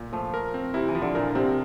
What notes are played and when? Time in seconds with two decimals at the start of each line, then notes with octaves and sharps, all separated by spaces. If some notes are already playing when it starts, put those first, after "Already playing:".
Already playing: A#2
0.13 F3 A3
0.34 A#4
0.54 C4
0.74 C3 E4
0.88 E3
0.95 F3
1.02 D3
1.15 A#2 A#4
1.35 C3 C4